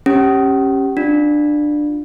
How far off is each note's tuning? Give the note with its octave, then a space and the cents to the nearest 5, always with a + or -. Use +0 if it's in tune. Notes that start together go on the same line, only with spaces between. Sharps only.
C#4 -20 G4 +0
D4 +15 F4 +15